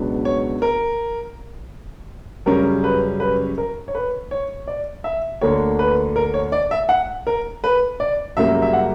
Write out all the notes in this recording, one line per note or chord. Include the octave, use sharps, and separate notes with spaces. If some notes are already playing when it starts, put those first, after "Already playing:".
Already playing: C#2 B2 F#3 B3 D4
C#5
A#4
F#2 C#3 G3 C#4 A#4
B4
B4
A#4
C#5
B4
C#5
D5
E5
D2 D3 A#3 D4 C#5
B4
A#4
C#5
D5
E5
F#5
A#4
B4
D5
F#2 C#3 G3 A#3 E5
E5
F#5